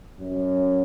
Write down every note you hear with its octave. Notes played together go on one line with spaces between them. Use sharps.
F#2